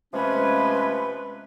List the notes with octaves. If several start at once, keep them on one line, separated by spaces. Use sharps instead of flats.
C3 F3 G#3 A3 C#4 B4